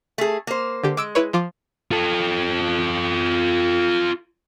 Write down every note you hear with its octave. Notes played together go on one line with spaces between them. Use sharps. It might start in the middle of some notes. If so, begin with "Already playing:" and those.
A3 G#4
A#3 C5
D3 G4
G#3 D6 E6 D7
E4 B4 C#5
F3 F4 D6
F4 A4